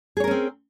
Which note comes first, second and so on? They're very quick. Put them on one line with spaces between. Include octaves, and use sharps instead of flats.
G#4 C#5 A#4 C#4 C4